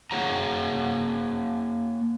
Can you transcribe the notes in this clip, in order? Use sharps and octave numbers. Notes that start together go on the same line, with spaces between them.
A#3 G#4 C#5 F#5 A#5